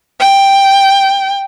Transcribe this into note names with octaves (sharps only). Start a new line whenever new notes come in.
G5